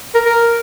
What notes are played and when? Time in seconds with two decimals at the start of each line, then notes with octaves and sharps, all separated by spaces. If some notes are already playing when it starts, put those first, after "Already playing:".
0.14 A#4
0.25 A#4